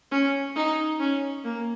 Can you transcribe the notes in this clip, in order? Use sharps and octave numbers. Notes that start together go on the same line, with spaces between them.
C#4
D#4
C#4
A#3